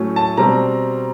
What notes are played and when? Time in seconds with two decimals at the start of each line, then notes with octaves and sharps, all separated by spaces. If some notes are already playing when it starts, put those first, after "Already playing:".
Already playing: A2 F#3 A3 C#4
0.16 A5
0.37 B2 G3 C4 A#5